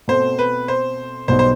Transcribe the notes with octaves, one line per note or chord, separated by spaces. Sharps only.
B2 A3 C4 C5
B4
C5
B1 B2 G3 B3 D#4 C5
C5